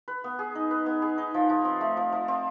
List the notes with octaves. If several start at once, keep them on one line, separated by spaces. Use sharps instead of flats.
B4
B3
G#4
D#4
B4
B3
G#4
D#4
F3
F3
C4
A3
F3
F3
C4